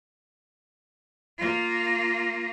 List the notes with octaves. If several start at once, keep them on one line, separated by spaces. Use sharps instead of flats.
A#3 F4